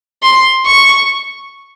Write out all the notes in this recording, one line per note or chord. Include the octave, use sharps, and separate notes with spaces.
C6
C#6